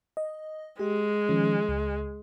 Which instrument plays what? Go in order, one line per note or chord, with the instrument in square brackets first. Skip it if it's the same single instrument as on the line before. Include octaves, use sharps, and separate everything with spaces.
[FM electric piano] D#5
[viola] G#3 [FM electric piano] G4
[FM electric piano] D#3 F3 C#4
C#2